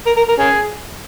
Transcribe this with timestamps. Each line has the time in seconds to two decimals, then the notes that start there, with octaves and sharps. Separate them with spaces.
0.06 A#4
0.17 A#4
0.29 A#4
0.39 C#4 G#4